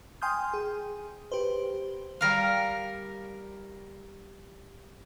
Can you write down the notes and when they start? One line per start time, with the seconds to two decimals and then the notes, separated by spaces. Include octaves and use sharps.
0.22 G5 G#5 C6 D#6 F6 G6
0.54 G#4
1.32 G4 B4 C5
2.21 G3 A#4 F5